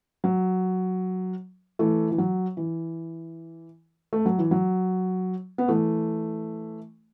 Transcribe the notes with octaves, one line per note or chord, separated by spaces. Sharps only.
F#3
E3 A3
E3
F#3
E3
A3
F#3
E3
F#3
B3
E3 A3